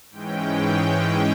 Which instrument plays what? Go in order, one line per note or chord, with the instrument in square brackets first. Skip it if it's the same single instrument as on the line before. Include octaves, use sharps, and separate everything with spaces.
[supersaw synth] G#2 E3 G#3 C#4 G5